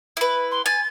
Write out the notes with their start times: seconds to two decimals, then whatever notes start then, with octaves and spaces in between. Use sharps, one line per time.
0.17 E4 B4
0.51 C6
0.66 G#5 A6